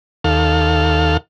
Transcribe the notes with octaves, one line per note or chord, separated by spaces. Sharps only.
D#2 A4 F5